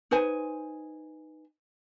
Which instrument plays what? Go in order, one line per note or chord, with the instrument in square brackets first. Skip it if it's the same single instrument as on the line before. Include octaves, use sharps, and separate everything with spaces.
[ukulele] D#4 B4 C5 G#5